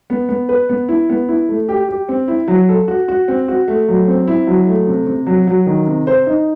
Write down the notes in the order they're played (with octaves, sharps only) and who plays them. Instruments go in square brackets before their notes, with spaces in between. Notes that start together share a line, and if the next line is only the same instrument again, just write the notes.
[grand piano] B3
B3
B4
B3
E4
B3
E4
A3
G4
G4
C4
E4
F#3
A4
F#4
F#4
C4
F#4
A3
F#3
C4
E4
F#3
A3
C3
C3
F#3
F#3
D#3
C3
C5
D#4